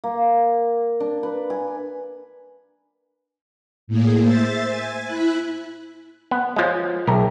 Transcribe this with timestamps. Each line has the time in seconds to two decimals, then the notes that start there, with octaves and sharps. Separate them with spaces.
0.04 A#3
1.00 D4
1.23 B4
1.50 G#5
3.87 A2 A#3 G#4
4.19 C5 E5 A6
4.67 G#5
5.06 E4 B5 F#6
6.31 B3
6.56 F3 G#3 C#5
7.07 B1 G#4 A#4 E5 G5